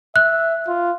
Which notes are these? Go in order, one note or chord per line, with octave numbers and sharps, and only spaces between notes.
E5 F#6
F4